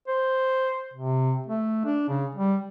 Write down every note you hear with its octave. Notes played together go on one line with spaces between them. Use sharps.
C5
C3
A3
D4
C#3
G3